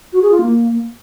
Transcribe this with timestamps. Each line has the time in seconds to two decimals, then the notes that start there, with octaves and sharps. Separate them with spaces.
0.13 F#4
0.22 G#4
0.32 F4
0.41 A#3